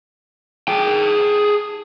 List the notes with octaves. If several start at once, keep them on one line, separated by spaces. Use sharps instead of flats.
G#4 G5